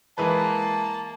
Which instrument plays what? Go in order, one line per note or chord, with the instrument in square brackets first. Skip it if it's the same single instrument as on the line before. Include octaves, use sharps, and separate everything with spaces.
[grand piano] E3 G#3 B4 [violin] A#3 [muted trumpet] A5